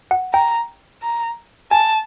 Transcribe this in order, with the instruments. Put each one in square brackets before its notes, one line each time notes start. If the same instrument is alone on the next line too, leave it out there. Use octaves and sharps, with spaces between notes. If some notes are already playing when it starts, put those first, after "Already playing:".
[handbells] F#5
[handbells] G5 [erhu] A#5
[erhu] A#5
[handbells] G#5 [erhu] A5